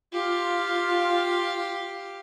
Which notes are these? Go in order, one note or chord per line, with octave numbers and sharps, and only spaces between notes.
F4 G4 F5